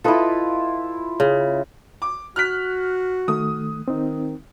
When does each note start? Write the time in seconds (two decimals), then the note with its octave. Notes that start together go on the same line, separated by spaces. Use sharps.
0.04 E4 F4 A4 B4 D#5
1.20 C#3
2.02 D6
2.36 F#4 F6 F#6 B6
3.28 D#3 A3 D#6
3.88 D#3 C4 D#4